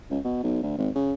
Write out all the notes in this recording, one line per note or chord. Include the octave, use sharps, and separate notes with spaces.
C#2
B2
B1
D2
G#1
C#3